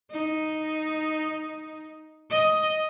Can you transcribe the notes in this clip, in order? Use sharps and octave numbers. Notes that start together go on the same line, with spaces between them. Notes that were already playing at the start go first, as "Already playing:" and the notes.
D#4
D#5